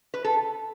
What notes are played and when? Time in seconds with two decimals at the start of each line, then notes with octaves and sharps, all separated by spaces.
0.14 B4
0.24 A4